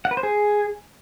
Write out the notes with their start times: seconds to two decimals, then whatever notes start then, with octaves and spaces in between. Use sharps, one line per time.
0.05 F#5
0.11 B4
0.17 C5
0.23 G#4